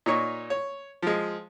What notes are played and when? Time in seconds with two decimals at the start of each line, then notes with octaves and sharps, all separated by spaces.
0.06 A#2 D#4 C#5 C#6
0.50 C#5
1.02 F3 G#3